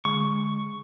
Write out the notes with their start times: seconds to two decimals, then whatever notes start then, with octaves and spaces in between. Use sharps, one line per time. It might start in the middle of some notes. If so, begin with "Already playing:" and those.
0.05 D3 G#3 C#6